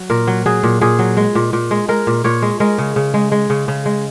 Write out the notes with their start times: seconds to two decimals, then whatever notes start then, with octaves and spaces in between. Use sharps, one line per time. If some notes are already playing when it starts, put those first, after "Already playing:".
Already playing: F#3
0.10 A#2 A#4
0.27 F#3
0.46 F#3 G#4
0.63 A#2
0.81 A#2 G#4
0.99 F#3
1.17 G#3
1.35 A#2
1.53 A#2
1.71 G#3
1.88 G#3 A#4
2.07 A#2
2.24 A#2 C#5
2.42 G#3
2.60 G#3 A#4
2.78 C#3
2.96 C#3
3.14 G#3
3.32 G#3
3.50 C#3
3.68 C#3
3.86 G#3